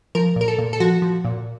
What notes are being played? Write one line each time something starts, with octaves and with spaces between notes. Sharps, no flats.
F3 A#4
A#2 A#4
A4
A#2
A4
F3 F#4
F3
A#2